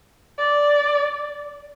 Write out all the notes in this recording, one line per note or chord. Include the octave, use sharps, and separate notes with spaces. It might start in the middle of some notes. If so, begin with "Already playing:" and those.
D5